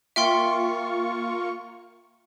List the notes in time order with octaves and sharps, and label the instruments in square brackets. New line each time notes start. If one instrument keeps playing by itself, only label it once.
[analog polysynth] A#3 F4 C#6 [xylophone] E5 G5 C6